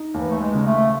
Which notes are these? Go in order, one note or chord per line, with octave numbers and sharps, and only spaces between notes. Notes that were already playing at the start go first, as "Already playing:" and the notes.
Already playing: D#4
D#2 E3
A3
G#3
C#3
A3